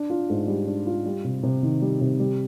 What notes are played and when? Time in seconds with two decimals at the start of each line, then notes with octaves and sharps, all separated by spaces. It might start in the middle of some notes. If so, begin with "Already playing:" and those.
Already playing: D4
0.10 F4
0.30 G#2
0.47 G3
0.67 D4
0.87 F4
1.06 G3
1.24 C3
1.43 C3
1.63 D#3
1.82 G3
2.01 C3
2.20 G3